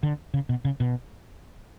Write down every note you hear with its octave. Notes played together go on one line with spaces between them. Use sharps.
D3
C#3
B2
C#3
B2